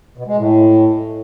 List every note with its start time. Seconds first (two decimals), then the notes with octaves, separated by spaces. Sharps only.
0.18 B2
0.27 G#3
0.37 A2